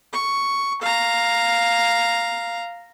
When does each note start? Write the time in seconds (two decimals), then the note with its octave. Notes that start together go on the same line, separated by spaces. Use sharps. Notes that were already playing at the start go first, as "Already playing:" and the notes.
0.13 C#6
0.82 F5 A#5